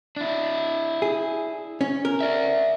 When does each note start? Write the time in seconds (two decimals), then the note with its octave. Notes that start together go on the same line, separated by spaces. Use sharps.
0.16 D4 E4
1.02 G#4
1.81 C#4
2.05 A#4
2.21 D5 E5